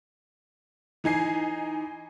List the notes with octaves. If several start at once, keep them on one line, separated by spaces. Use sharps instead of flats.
E3 D#4 G#5 C7